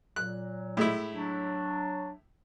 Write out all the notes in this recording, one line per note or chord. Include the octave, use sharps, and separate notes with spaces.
A#2 F#3 F#6
A2 G#3 E4
F#3 D4